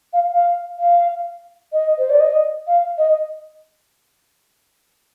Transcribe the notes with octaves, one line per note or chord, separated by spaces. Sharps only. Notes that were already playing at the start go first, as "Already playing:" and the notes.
F5
F5
F5
D#5
C5
D5
D#5
F5
D#5